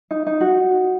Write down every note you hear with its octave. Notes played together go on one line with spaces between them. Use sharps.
D#4
D#4
F#4